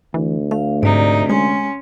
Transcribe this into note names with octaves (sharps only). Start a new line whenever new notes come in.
D2 E3
A3 F5
G#2 C3 D#4 D5
G#3 C#4 G#5 C6